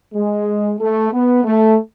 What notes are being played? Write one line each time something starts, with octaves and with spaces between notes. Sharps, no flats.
G#3
A3
B3
A3